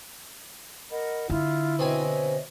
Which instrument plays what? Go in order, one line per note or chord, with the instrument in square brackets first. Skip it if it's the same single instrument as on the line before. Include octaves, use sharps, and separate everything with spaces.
[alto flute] A#4 [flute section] D#5 F#5 B5
[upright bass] D3 [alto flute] E4 [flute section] F4
[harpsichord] B2 C4 G#5 [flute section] C#5 D#5 E5